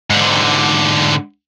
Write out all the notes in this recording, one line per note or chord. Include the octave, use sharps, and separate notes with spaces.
G#2 D3